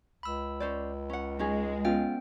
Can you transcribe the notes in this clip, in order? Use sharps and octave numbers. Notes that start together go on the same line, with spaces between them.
C#2 B5 E6
C#4 C5 D5
C#4 F#5
G#3 C#4 D#4 G#4
B3 C#4 F4 G5